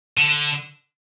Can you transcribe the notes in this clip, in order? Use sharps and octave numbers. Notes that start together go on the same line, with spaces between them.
D3